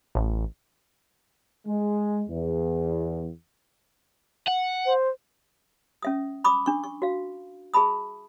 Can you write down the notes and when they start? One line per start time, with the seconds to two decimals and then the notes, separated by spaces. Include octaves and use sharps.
0.15 A1
1.67 G#3
2.29 E2
4.48 F#5
4.86 C5
6.02 C#4 E5 D#6
6.44 B5 D6 D#6
6.66 D4 C#6
6.84 C#6
7.02 F#4 F5
7.74 G#4 E5 A5 B5 D#6